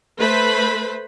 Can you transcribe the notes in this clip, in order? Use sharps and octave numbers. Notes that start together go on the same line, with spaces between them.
A3 B4 C5 B5